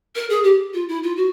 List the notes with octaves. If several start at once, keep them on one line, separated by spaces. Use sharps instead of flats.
A#4
G#4
G4
F4
E4
F4
F#4